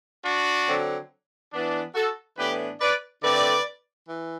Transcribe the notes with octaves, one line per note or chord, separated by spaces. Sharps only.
D4 F#4
D3 F#3 C4
E3 B3 D4
F#4 A4
A2 E3 B3 D4 G4 B4
B4 D5
D3 A3 C4 B4 D5
E3